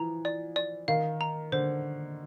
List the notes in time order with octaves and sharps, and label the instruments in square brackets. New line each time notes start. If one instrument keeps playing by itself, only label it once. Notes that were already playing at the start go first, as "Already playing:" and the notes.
Already playing: [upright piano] E3 F3 [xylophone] A#5
[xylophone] D5
D5
[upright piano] D#3 [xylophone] F5
[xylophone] A#5
[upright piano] D3 [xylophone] C5